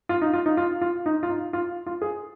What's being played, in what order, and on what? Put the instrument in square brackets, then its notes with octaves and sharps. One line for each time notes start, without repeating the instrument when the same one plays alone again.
[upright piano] F4
D#4
F4
D#4
F4
F4
D#4
F4
D#4
F4
F4
G#4